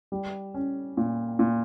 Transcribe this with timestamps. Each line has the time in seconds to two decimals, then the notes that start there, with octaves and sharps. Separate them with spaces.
0.12 G3
0.54 C#4
0.97 A#2
1.39 A#2